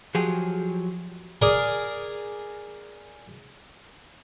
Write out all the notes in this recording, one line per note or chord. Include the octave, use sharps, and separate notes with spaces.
F3 F#3 G4 G#4
G#4 A#4 D5